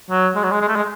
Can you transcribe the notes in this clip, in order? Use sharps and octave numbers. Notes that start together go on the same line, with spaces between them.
F#3
G#3
F#3
G#3
G#3
A3
G#3